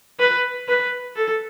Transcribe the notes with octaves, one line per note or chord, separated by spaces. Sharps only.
B4
B4
A4